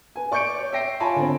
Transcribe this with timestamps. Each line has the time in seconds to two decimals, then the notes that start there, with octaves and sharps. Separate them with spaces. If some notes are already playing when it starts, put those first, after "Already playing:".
0.16 B4 G#5
0.32 D5 C#6 D6 G6 C#7 D7
0.59 C#5
0.72 E5 G5 A#6 C7 D7
1.00 F4 C#5 G#5 A5 B5 C6
1.16 D3 C4